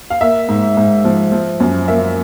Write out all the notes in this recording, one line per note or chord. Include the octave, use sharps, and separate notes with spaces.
F5
A#3 E5
G#2
G#2
F3
F3
F#2
A#3 E5